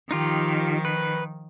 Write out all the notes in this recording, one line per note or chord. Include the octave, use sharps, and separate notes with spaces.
D#3 F3 D#4 F4 G4
B4